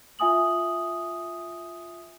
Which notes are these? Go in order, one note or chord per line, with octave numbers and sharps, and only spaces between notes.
F4 E5 G#5 D#6 F#7